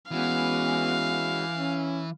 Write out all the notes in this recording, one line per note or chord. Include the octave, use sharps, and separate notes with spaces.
E3 G#3 B3 C#4 F#4 F5
C#4